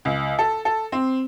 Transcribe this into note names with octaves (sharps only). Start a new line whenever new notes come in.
C#2
A4
A4
C4